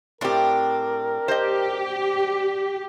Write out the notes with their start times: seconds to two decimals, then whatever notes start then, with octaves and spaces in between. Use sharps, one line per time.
0.21 A2 C4 D4 G4 A#4
1.28 G4 C5 D#5